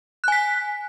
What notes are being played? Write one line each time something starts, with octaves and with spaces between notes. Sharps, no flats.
G#5 F#6 B6